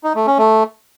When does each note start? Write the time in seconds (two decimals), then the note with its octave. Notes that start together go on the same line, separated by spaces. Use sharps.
0.04 D#4
0.15 A3
0.27 C#4
0.38 A3